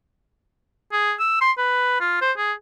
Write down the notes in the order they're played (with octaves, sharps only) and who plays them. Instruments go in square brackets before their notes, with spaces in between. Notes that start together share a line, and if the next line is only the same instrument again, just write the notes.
[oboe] G#4
E6
C6
B4
F4
C5
G#4